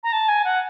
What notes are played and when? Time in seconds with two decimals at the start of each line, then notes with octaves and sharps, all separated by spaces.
0.03 A#5
0.13 A5
0.28 G#5
0.44 F#5